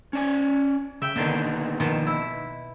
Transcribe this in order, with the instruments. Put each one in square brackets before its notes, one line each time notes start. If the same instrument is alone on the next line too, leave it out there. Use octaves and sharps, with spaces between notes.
[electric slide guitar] C#4 D5 G#5
[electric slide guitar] C#3 [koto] E5 G5
[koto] B2 D3 D#3 [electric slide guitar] A#3 B3 D#4
[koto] B2 D#3 F3
E4